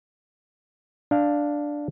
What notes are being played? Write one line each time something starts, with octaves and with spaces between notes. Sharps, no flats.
D4 F5